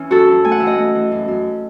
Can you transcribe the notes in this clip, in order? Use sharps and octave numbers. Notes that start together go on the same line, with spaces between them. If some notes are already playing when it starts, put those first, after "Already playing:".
Already playing: E3 C#4
F#2 F#4 A4
F#2
A3 G#5
F#5
E3 E5
D#5 F#5
A3
E3
F#2
F#2